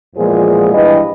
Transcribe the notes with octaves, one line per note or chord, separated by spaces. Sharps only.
E2 A#2 F3 G#3 G#4
G2 E3 B4 D#5